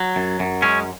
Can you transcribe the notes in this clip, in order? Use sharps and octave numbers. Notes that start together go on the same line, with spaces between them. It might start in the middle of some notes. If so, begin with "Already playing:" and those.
Already playing: F#3
F#2
F#2
G#3 C#4